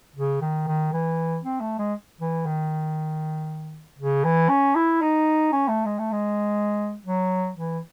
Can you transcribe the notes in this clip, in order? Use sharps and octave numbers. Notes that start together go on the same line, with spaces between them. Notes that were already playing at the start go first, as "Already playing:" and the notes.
C#3
D#3
D#3
E3
C4
A3
G#3
E3
D#3
C#3
E3
C#4
E4
D#4
C#4
A3
G#3
A3
G#3
F#3
E3